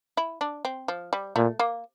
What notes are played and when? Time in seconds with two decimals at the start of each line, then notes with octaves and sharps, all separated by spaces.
0.17 E4
0.41 D4
0.65 C4
0.88 F3
1.13 G3
1.36 A#2 A3
1.60 A#3